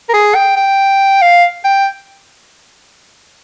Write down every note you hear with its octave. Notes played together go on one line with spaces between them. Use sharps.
A#4
G#4
G5
G5
F5
G5